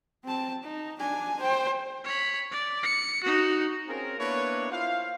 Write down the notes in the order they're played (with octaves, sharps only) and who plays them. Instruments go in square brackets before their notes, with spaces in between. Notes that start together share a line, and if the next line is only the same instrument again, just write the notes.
[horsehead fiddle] C4 A5
D#4
D4 G#5
C5 G5
[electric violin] C#5 B5
D5
C#7
D#4 F#4
[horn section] C4 C#4 F4 G#4 A#4
A#3 B3 D4 E4 B4 C#5
E4 F4 C5 F5